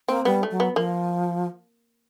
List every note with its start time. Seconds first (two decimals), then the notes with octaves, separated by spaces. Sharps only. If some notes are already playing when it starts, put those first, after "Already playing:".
0.08 A#3 C4
0.25 G3 B3
0.43 A3
0.51 F#3
0.60 B3
0.76 F3 A#3